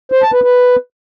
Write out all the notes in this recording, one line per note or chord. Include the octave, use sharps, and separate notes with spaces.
C5
A5
B4
B4